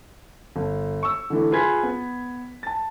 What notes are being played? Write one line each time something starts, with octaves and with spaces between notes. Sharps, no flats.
G1
C#6 E6
D3 E3 A3
F4 G#4 B4 C6 G#6 B6
B3
A5 A6